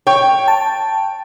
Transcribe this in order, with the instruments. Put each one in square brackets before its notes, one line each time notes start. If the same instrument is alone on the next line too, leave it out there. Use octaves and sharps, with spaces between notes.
[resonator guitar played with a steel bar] C#5 [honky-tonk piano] G5
[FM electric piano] A5